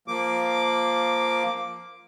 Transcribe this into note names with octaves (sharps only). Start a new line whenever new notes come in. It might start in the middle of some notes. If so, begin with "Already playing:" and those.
F3 A#3 D6